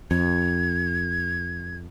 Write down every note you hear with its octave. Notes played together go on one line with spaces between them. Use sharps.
F2 G#6